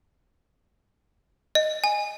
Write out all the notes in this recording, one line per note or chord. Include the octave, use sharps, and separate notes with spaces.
D#5
G#5